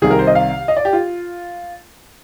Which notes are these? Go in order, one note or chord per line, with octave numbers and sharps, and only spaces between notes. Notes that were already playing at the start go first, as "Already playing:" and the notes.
C2 C3 D#3 G#4
A#4
C5
D#5
F5
D#5
D5
G4
F4